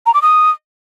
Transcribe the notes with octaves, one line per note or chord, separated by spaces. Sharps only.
A#5
D6
D#6